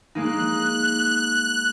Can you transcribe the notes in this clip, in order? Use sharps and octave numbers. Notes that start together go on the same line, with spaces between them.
G#3 A#3 D#4 F#6